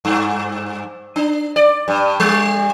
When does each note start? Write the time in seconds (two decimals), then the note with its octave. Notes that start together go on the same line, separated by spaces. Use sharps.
0.05 G2
1.16 D4
1.56 D5
1.88 G2
2.20 G3